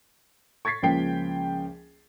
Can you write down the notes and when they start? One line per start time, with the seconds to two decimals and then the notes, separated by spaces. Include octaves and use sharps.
0.65 C#6 G#6 A6 B6 C7
0.82 C#2 C#3 F3 A#3 G5 C7